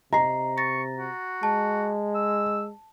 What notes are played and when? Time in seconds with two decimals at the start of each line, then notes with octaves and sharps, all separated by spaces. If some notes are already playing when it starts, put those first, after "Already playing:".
0.13 C3 D#5 A#5 C7
0.58 C#6 A6 A#6
0.98 F#4
1.43 G#3 A5
2.15 E6